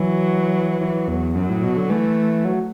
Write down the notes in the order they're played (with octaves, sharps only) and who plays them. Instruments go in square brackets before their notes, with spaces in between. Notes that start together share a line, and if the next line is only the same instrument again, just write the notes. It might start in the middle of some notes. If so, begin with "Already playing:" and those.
Already playing: [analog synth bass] E3 [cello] F#3
[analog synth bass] E3
E2
[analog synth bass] F#2 [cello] F#3
[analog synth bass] A2
B2
D3
[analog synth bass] E3 [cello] A3
[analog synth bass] F#3